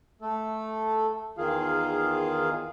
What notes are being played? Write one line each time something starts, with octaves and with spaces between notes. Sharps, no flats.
A3 A4
E2 D#3 F4 G#4 F5